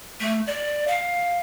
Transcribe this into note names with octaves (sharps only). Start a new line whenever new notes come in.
A3
D5
F5